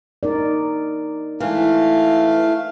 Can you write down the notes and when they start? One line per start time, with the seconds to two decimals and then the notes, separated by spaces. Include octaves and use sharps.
0.23 D#4 A#4 D5
1.40 E3 G#3 A3 F5